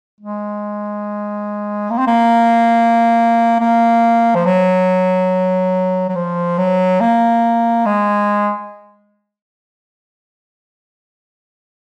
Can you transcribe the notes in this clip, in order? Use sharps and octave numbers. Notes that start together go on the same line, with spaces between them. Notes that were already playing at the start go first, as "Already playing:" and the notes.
G#3
A#3
C4
A#3
A#3
F3
F#3
F#3
F3
F#3
A#3
G#3